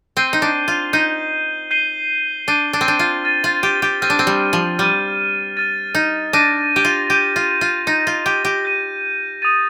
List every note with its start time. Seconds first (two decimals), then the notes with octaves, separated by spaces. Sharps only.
0.17 C4 G6 C7 D#7 G7
0.33 D#4
0.42 D4
0.68 F4
0.93 D#4 G6 C7 D#7 G7
1.71 G6 C7 D#7 G7
2.48 D4 G6 C7 D#7 G7
2.73 D4
2.81 C4
2.88 D4
2.99 F4
3.24 F6 A6 D#7
3.44 F4
3.63 G4
3.82 G4
4.02 C4 F6 A6 D#7
4.10 D4
4.19 C4
4.27 G3
4.53 F3
4.78 G3 F6 A6 D#7
5.57 F6 A6 D#7
5.95 D#4
6.33 D4 G6 A#6 D#7
6.76 G4
6.85 F4
7.10 G4 G6 A#6 D#7
7.36 F4
7.61 F4
7.87 D#4 G6 A#6 D#7
8.07 F4
8.26 G4
8.45 G4
8.65 G6 A#6 D#7
9.42 D#6 A6 D#7